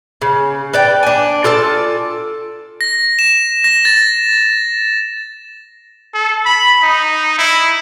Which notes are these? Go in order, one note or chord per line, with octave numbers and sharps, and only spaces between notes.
C#3
B4 D5 G5
D4 G#5
F4 A4 D5 A5
A#6
E7
A#6
A6
A4
B5
D#4
E4